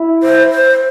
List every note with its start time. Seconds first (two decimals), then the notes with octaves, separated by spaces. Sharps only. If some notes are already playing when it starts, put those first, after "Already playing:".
Already playing: E4
0.23 C5
0.52 C5